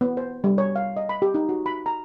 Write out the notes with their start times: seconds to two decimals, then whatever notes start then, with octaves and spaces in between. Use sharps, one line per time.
0.01 B3
0.17 C5
0.44 G3
0.58 C#5
0.76 F5
0.97 D#5
1.09 B5
1.22 G4
1.34 D#4
1.49 F#4
1.66 B5
1.86 A#5